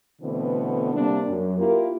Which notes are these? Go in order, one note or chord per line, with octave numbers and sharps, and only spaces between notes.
B2 D3 E3 A3 B3 C4
C3 G3 A#3 C4 D4
F#2
A#3 E4 F4 G4 A#4